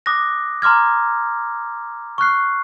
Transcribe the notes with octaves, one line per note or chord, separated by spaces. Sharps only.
D6 D#6 F#6 A#6
A#5 C6 D6 F6 G#6
C#6 F6 F#6 C7